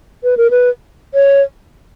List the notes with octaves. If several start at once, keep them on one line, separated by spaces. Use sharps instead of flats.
B4
A#4
B4
C#5